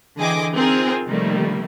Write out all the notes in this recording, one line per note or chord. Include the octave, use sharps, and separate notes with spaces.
D3 E3 G#4 D#5 G5 D6
C4 D#4 F4 G#4 A#4
C3 D#3 F3 G3 A3 A#3